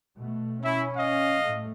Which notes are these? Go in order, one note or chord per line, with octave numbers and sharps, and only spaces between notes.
B2 A3
C#4 E4
D#5 F5
A2 A3